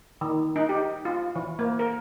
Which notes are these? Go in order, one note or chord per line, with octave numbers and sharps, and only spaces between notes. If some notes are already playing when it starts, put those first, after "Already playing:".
D#3
D#4
G4
F4
E3
A#3
A#4